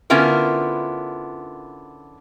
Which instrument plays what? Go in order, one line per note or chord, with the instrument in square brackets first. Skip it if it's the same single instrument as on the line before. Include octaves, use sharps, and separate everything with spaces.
[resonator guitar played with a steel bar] D3 B3 C#4 E4 F4 A#4